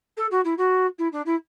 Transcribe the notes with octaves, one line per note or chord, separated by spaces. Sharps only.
A4
F#4
E4
F#4
E4
D4
E4